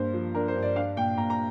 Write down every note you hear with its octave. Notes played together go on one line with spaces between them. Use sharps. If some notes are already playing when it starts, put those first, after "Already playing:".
Already playing: G2 A#3 C5
F3
D4 A#4
C5
G2
D5
D4 F5
A#2 G5
A#2 A#5
A#5